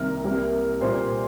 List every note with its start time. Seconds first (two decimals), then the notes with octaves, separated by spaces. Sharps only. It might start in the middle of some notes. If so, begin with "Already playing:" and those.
Already playing: C2 C3 D#3 A#3 A#4
0.24 C2 C3 G3 A#3
0.81 A#2 G3 A#3 C5